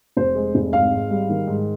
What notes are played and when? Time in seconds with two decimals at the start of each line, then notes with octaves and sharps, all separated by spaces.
0.17 F1 C5
0.35 G#3
0.55 F1
0.73 G#1 F5
0.92 G#2
1.11 G3
1.29 D#3
1.47 G#2